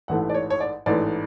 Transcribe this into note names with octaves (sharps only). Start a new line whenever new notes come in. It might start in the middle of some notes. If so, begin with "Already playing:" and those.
A1 G#2 E3 A3 F#5
D5
C#5
C#5
D5
A1 G#2 E3 A3 D5